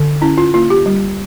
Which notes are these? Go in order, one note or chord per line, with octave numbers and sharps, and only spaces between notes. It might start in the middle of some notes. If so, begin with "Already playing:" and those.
Already playing: D3
C#4 E4
F4
A#3 F4
G4
G3